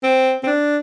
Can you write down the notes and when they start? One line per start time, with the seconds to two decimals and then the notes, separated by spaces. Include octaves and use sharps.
0.03 C4
0.43 C4
0.47 D4